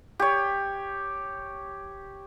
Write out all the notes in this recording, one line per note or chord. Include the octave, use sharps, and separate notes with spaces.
G4 C#5